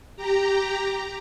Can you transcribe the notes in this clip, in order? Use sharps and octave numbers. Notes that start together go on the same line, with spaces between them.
G4 A#5